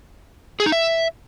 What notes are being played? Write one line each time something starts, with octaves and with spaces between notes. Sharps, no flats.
G#4
D#4
E5